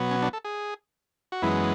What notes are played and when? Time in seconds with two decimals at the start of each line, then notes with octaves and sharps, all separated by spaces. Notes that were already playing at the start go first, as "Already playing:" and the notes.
Already playing: B2 F#3 B3
0.11 C#4
0.22 D4
0.33 A4
0.45 G#4
1.32 F#4
1.42 F#2 E3 G#3 B3 E4